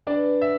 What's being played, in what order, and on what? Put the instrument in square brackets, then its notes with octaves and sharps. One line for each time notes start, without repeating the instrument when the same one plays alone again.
[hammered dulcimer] E3 [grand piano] D4 D5
[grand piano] E5